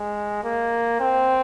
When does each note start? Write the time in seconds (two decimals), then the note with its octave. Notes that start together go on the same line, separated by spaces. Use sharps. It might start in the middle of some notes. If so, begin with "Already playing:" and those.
Already playing: G#3
0.44 A#3
1.01 C4